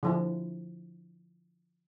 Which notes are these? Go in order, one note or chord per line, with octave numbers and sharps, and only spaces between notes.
D3 F3 E4